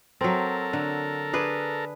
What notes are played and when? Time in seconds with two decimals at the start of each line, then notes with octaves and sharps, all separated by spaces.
0.21 F#3 C4 A4 A#4
0.73 D3
1.33 D4 G#4 B4